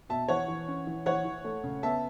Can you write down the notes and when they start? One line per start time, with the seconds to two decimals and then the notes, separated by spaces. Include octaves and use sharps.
0.09 B2 E5 A5
0.28 E3 C#5 F#5
0.48 E3
0.68 C#4
0.87 E3
1.06 E3 C#5 F#5
1.25 E3
1.44 A3
1.64 C#3
1.83 B3 E5 A5